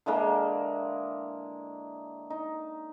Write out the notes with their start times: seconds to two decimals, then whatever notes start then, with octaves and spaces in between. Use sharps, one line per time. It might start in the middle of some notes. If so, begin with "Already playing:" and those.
0.06 D3 E3 G#3 A#3
2.30 D#4